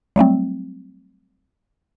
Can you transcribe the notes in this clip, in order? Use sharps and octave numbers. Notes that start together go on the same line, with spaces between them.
F#3 G3 A3 C4